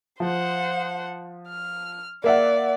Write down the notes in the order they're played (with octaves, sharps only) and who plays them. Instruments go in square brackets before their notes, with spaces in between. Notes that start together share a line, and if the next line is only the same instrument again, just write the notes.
[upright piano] F3 [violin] C5 F#5
[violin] F6
[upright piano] A#3 E5 F#5 [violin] D5